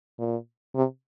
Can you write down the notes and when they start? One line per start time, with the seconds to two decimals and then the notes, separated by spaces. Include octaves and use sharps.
0.19 A#2
0.75 C3